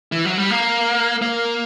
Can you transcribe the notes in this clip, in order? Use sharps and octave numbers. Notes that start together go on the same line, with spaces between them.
E3
F#3
G3
A#3
A#3